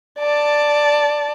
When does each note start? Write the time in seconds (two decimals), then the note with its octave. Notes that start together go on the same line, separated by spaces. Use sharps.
0.19 D5 A5